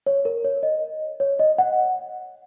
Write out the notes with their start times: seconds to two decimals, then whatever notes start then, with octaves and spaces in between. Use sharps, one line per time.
0.06 C#5
0.25 A#4
0.44 C#5
0.63 D#5
1.20 C#5
1.39 D#5
1.58 F#5